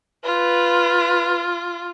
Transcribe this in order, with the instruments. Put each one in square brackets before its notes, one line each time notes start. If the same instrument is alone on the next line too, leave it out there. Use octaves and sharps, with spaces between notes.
[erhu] F4 [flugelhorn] B4